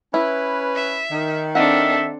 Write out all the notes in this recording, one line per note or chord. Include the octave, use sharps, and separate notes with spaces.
C#4 E4 B4
E5
D#3
C4 D4 D#4 A4 E5 F#5